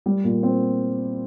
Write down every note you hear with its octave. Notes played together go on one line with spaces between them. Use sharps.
G3
A#2
C4